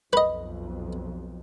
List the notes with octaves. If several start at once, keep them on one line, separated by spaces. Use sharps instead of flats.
B1 F2 B4 D#5